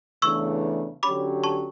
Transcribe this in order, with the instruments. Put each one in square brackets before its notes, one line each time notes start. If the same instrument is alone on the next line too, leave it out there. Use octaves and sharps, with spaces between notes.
[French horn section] E2 C#3 E3 A3 D4 [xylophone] C#6 E6
[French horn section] D3 F#3 C#4 G4 C#5 [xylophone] B5 D6
[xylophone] A5 C#6